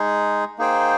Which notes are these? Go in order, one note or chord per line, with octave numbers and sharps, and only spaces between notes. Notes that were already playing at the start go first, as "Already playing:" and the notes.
Already playing: G#3 D#4 G#4
A#3 D#4 G#4 C5 G5